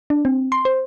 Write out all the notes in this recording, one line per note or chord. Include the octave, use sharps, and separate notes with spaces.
D4
C4
C6
C5